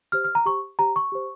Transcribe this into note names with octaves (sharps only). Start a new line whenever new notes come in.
G4 C5 F6
F6
A#5
G4 C5 C#6
G4 C5 A#5
C#6
G4 C5